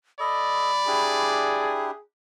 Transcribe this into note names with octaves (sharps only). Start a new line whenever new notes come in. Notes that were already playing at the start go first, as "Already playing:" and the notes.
A4 D5 D#5 B5
D4 E4 G4 G#4